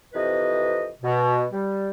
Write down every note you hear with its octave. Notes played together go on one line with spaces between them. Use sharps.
F2 C3 E3 B4 D#5
B2
G3